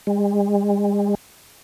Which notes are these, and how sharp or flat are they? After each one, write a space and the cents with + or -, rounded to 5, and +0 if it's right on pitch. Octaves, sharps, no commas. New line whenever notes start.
G#3 -40